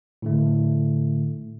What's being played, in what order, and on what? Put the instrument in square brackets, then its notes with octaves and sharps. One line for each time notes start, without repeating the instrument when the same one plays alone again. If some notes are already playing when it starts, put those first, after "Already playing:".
[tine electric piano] A2 D3 A3